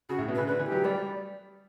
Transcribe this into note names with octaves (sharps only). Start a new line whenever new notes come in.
C#3 F#4
A2
B2
C#3 B4
D3 B4
E3
G4
F#3
G3 D5